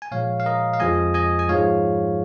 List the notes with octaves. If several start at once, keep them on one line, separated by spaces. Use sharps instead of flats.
G#5
A#2 F3 G#3 C#5 F5
F5
A#4 D#5
F5
F2 F3 G#3 D#5 G#5
D#5 G#5
G#5
G#2 F3 G#3 C#5 F5